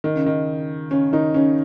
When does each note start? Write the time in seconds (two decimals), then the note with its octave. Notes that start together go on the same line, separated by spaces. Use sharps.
0.04 D#3
0.15 C#3
0.26 D#3
0.91 C#3 C#4
1.13 D#3 D#4
1.34 C#3 C#4